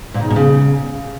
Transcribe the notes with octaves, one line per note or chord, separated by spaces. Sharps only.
A#2
D#3
E2
B2
C#3